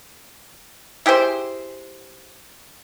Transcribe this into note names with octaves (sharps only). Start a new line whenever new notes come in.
E4 G4 G#4 C5